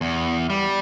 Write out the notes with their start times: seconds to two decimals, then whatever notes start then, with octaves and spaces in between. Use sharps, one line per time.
0.01 E2
0.50 G3